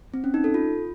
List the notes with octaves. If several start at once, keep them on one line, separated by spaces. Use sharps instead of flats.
C4
C#4
D#4
A4
F4